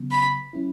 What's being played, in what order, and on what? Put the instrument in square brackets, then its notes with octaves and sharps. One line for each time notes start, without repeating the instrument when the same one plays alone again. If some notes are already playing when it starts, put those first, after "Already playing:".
Already playing: [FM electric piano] C#3 F#3 B3
[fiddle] B5
[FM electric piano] F#3 C#4 E4